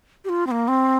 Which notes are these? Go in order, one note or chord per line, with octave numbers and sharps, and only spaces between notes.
G4
F4
C4
A#3
C4